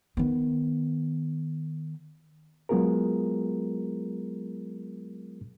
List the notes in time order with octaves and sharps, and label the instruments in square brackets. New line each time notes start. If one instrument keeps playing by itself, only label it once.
[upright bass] D#3 B3
[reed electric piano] F#3 G#3 B3 F4 G#4 A#4